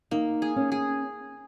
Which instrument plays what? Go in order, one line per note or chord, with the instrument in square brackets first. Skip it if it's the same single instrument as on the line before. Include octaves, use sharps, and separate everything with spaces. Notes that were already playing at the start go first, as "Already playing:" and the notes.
[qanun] A#3 [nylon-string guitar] D#4
[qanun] G#4
[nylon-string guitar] C#4
[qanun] G#4